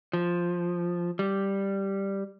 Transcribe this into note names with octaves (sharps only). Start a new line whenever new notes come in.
F3
G3